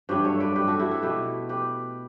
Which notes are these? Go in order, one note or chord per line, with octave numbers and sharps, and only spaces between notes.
G2 F#3 A3 G4 B4
A4 C#5
B4 D5
G4 B4
F#4 A4
E4 G4
F#4 A4
B2 A3 G4 B4
G4 B4